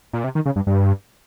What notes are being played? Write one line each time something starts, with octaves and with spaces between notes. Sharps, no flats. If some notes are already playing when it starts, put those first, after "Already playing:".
A#2
C3
D#3
C#3
G2
G2